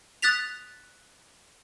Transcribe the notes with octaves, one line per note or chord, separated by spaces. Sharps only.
D#6 F#6 A6 B6 F7